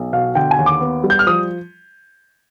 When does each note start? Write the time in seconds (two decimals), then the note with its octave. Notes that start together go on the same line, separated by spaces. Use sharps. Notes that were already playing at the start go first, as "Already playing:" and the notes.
Already playing: B1
0.13 B2 F5
0.35 D3 G5
0.51 G#5
0.58 D#2
0.66 D6
0.81 B3
1.04 G3
1.10 G6
1.19 F6
1.27 F3 D#6